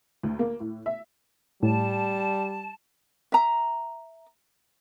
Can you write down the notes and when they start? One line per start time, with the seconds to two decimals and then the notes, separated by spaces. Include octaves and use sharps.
0.23 D2
0.39 A#3
0.60 A2
0.86 E5
1.63 A2 G3 A5
3.32 E5 A#5